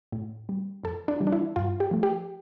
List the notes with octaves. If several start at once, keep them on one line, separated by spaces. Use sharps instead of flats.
A2
G3
F2 A4
D4
E3 G3
D4
E4
G2 F4
G4
F3 A3
G4